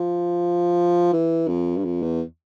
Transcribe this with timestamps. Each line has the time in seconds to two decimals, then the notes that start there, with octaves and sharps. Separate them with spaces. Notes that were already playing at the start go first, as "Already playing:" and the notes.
Already playing: F3
1.13 E3
1.48 F2
1.77 G2
1.85 F2
2.02 E2